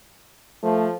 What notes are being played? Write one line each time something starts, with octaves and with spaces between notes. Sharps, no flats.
F3 A3